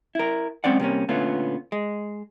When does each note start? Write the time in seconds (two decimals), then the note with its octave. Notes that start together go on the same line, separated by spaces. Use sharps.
0.15 E4 A#4
0.64 F#2 G#3 C4 C#4 D5 F#5
0.80 C3 G3 A#3 C#4
1.09 A#2 D3 A3 B3 C#4 F4
1.72 G#3